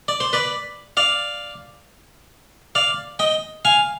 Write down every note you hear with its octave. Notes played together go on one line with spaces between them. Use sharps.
D5
C5
B4 D5
D5 F5
D5 F5
D#5 G5
F5 G#5